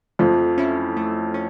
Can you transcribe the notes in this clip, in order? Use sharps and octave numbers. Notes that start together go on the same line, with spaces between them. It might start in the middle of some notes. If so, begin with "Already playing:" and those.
F2 F3 A3
C#4 E4
A3
C#4